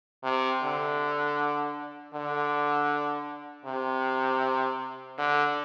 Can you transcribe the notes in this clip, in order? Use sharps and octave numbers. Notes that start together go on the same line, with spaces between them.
C3
D3
D3
C3
D3